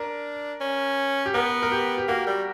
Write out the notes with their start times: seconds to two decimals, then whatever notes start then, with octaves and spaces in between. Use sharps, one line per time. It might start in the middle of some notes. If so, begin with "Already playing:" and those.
Already playing: D4 A#4
0.61 C#4
1.26 G4
1.34 B3 A#4
1.62 A#4
1.72 G4
1.98 G4
2.08 A#3 F#4
2.27 G3